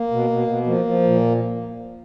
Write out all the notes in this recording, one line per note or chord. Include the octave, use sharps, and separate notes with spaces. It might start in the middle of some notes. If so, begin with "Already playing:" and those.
Already playing: A#3
B2
B2
B2
F3 A#3
F3
A#2